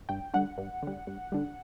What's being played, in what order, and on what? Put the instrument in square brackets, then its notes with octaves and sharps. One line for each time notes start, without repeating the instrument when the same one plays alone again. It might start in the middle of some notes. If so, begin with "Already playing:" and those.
[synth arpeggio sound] G2 G5
D3 G3 F#5
G2
D3 G3
G2
D3 G3